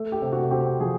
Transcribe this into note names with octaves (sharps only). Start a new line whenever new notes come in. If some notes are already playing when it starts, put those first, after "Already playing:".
Already playing: A3
G4
C3
F#4
C4 G4
F3 G#4